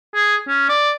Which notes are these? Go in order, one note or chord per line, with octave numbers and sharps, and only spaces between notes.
G#4
C#4
D5